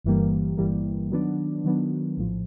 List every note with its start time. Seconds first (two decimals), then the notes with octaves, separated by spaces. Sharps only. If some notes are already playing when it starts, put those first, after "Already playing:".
0.04 G1 G2 E3 G3 A#3
0.57 G1 G2 E3 G3 A#3
1.11 D#3 F#3 B3 D4
1.64 D#3 F#3 B3 D4
2.17 A#1 A2 F3